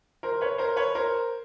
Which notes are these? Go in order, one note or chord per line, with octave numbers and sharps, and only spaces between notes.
A#4 C5
B4 C#5
A#4 C5
B4 C#5
A#4 C5